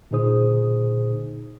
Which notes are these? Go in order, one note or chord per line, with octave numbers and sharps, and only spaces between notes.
A#2 D3 D#4 G#4 C5 D#6